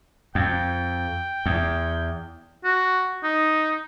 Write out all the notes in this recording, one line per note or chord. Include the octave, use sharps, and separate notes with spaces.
F2 G5
E2
F#4
D#4